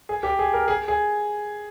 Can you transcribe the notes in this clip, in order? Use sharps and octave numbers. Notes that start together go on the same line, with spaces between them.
G#4
G4
G#4
A#4
G#4
G#4